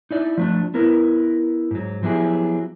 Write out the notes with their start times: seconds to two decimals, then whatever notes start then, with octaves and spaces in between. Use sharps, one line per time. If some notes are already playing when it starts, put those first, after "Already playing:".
0.11 D#4 E4 D5
0.37 F3 A3 D4
0.74 B3 E4 A#4 B4
1.71 G#2 F#3
2.03 F3 F#3 B3 E4 G4 G#4